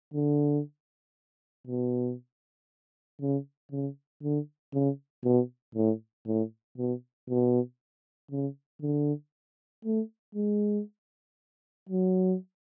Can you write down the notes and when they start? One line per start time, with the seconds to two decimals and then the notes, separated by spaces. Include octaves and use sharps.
0.14 D3
1.67 B2
3.21 C#3
3.71 C#3
4.23 D3
4.74 C#3
5.24 B2
5.75 A2
6.26 A2
6.78 B2
7.30 B2
8.31 C#3
8.82 D3
9.85 A3
10.35 G#3
11.89 F#3